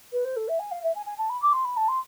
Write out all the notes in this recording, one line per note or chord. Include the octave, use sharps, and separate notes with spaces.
B4
C5
A4
E5
G#5
F5
E5
G#5
G#5
A5
B5
D6
C6
B5
A5
C6